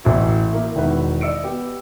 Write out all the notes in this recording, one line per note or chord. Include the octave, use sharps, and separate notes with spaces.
A1 E3 E4 F#4
A#3 E4
E1 D#3 E4 F#4 B4
D5 D#5 E6 C#7 D7
B3 G4